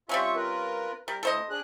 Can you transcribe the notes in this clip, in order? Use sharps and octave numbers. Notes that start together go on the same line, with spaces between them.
G3 C4 C#4 F4 E5 C#6
F4 A#4 B4
G3 A#4
D2 E4 A4 C5 D#5
D4 G#4 F#6